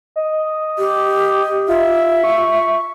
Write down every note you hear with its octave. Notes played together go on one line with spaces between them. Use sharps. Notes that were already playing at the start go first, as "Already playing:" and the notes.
D#5
G4
F4 E5
C#6